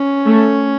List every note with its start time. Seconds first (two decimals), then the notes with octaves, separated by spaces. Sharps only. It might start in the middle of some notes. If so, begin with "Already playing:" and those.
Already playing: C#4
0.26 A3